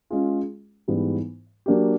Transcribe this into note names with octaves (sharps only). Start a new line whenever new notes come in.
G#3 C#4 F4 G#4
G#2 E3 G3 B3
F#3 A#3 D4 G4